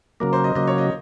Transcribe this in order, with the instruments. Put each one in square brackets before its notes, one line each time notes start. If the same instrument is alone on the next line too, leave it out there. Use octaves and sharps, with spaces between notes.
[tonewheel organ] C#3 F#3 A#3 [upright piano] A#4
[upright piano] C5
D#5
[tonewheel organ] C#3 F#3 A#3 [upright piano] D#5
[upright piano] C#5
D#5